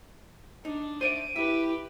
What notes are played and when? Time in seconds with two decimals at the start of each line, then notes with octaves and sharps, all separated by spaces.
0.65 D4 D#4
1.01 C5 D5 E5 D7 D#7
1.36 E4 G4 B4 E5